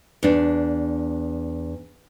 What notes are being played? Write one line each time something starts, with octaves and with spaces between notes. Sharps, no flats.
E2 D4